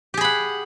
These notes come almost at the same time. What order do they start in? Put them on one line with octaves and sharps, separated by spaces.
G4 G#4 B5 F#5